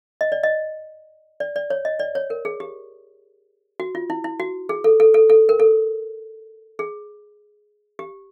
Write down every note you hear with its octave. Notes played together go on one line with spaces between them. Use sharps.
D#5
D5
D#5
D5
D5
C#5
D#5
D5
C#5
A#4
G#4
G4
F#4
F4
E4
E4
F#4
G#4
A4
A4
A4
A4
A#4
A4
G#4
G4